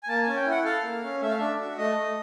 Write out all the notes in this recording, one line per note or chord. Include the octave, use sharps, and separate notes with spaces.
G#5
A#3 A5
G#5
C#4
G5
E4
F#5
A4 F5
A#3
C#4
A3 E5
F5
D4 E5
F#4
A3 D#5
A3